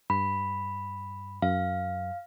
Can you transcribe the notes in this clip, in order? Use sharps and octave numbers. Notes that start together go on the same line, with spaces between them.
G2 B5
F#2 F5